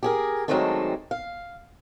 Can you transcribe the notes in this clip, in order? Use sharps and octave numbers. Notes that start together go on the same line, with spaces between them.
G4 G#4 A#4
D#3 F#3 G#3 A3 C4 D4
F5